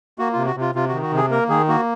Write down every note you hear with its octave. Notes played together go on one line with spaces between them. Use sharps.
A#3 F#4
C3 F4
F#4
C3
F4
C3 F4
F#4
D#3
F#4
C3 G#4
A#3 A#4
D#3 G#4
A#3 F#4